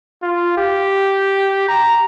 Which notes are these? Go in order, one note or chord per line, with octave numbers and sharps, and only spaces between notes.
F4
G4
A#5